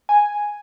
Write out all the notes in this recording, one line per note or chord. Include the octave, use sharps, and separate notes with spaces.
G#5